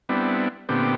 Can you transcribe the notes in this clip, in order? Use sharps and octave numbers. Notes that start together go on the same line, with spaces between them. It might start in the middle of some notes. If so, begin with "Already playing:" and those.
G3 B3 C4 D4 E4
A#2 D3 B3 C4 G4